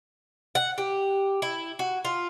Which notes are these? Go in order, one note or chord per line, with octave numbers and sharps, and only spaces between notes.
F#5
G4
E4
F#4
F4